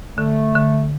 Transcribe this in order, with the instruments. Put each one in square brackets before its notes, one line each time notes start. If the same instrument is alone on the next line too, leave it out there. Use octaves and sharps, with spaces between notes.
[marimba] D3 [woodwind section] A3
[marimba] D3